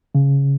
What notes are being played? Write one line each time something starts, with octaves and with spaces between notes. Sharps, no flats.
C#3